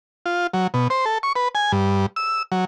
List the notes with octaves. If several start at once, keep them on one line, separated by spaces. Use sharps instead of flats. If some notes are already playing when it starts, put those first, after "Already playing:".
F4
F#3
B2
C5
A4
C#6
B4
G#5
G2
E6
F#3